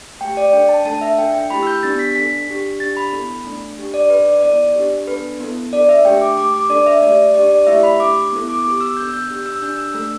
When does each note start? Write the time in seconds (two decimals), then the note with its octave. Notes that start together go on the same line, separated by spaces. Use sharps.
0.21 A3 G4 G5
0.37 D5
0.53 D4 A4 G5
0.69 A5
0.85 A3 D4 A4 A5
1.01 E5
1.18 D4 A4 G5
1.34 G5
1.50 A3 E4 G4 B5
1.63 E6
1.67 G6
1.83 B3 D4 G4 A6
1.99 B6
2.15 D4 A4 B6
2.48 D4 G4
2.80 D4 G4 A6
2.97 B5
3.12 B3 E4 A4
3.45 A3 D4 A4
3.77 D4 G4
3.94 D5
4.10 D4 A4 B4
4.27 D5
4.42 B3 E4 A4 D5
4.76 D4 G4
5.07 B3 D4 A4 B4
5.40 B3 E4 A4
5.72 D4 A4 D5
5.89 E5
6.05 A3 D4 G4 G5
6.21 D6
6.37 A3 G4 D6
6.54 D6
6.70 D4 A4 D5
6.86 E5
7.02 A3 G4 D5
7.35 D4 G4 D5
7.51 D5
7.67 A3 E4 G4 E5
7.83 B5
8.00 A3 D4 G4 D6
8.32 B3 E4 A4
8.49 D6
8.65 B3 G4 D6
8.81 E6
8.97 B3 D4 A4 G6
9.08 E6
9.13 G6
9.30 D4 G4 G6
9.46 E6
9.57 E6
9.62 D4 G4 G6
9.78 E6
9.94 A3 D4 A4 E6